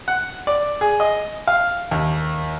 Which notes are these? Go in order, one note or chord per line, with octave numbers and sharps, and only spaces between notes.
F#5
D5
G#4
D#5
F5
D#2